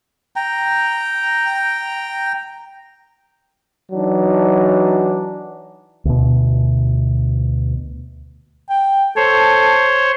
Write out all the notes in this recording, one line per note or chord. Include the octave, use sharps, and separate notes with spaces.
G5 A#5
E3 F#3 D4 D#4
D2 B2
G5
A4 C5 C#5